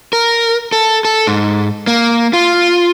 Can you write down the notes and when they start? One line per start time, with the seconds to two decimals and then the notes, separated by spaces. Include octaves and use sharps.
0.13 A#4
0.72 A4
1.05 A4
1.27 G#2
1.87 A#3
2.33 F4